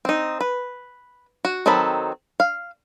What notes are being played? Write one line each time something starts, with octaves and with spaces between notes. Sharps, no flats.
C4 D#4
B4
F#4
D#3 F#3 C4 A4 B5
F5